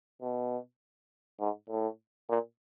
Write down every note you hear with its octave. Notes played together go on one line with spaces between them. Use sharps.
B2
G#2
A2
A#2